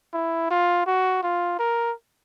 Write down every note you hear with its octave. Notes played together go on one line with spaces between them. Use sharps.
E4
F4
F#4
F4
A#4